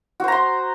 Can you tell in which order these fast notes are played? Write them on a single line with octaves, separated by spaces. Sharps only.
F#4 C5 A#5 C6